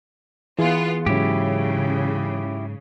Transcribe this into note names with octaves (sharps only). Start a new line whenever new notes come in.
E3 B3 F4 G#4
G#2 C#3 F#3 E4 G4